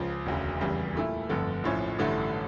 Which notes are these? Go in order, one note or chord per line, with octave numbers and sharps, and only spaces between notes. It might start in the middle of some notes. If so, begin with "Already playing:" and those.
Already playing: C#2 C#3 F3
E1 D2 C#3
F1 E2 C#3 G3
A#2 A3 E4
G1 F2 D3 A3
A#1 A2 F3 C#4
A1 G2 D3 A3 E4